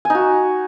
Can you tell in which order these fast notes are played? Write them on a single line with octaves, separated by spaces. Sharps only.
G#5 D#4 F#4